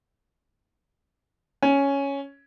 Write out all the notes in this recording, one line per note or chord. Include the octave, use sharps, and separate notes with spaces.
C#4